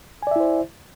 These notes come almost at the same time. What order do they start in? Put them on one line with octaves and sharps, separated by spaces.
G#5 D5 E5 E4 C5